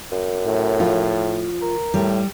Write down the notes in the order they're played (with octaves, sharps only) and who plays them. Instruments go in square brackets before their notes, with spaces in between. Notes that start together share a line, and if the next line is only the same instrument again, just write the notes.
[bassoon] F#2
[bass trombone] A2
[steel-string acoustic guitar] F3 F4
[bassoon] A#4
[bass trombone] A2 [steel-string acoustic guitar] G3